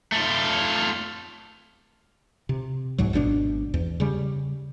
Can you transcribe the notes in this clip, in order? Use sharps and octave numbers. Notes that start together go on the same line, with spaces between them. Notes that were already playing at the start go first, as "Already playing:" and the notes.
A3 F4
C3
B1 G#2 F#3
G#1 B2 C#4 D4
E2
C#3 G3